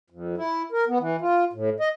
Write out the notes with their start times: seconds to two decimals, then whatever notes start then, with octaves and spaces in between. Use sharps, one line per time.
0.10 F2
0.37 E4
0.72 A#4
0.88 B3
0.99 E3
1.21 F4
1.53 A2
1.80 D#5